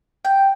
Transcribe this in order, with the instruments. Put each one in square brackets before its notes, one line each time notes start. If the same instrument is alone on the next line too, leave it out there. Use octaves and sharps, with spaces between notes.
[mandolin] G5